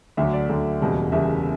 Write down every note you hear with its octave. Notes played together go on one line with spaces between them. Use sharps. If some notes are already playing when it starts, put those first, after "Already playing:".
D2 D3 F#3 E5
D5
D2 D3 F#3
F#1 E2 B2 G3
F#1 E2 B2 G3 E5